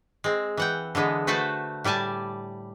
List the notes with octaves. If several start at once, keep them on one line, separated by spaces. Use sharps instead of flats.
G#3 C4
E3 F#5 G5
D3 E3 G#3 B3
A3 F#4 B4 C5 A5
A2 G3 D5 G#5 A5